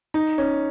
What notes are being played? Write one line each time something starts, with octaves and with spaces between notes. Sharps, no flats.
D#4
C#4